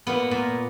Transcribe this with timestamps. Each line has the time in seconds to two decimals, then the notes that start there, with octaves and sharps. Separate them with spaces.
0.07 A#2 B3
0.31 A#2